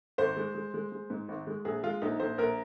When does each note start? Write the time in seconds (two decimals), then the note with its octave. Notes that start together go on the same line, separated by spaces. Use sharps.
0.18 G#1 C5
0.36 G#3
0.55 G#3
0.74 G#3
0.92 G#3
1.10 G#2
1.28 G#1
1.47 G#3
1.65 A#1 G#4
1.83 G#3 F4
2.02 A#1 D#4
2.20 A#1 C5
2.38 A#1 A#4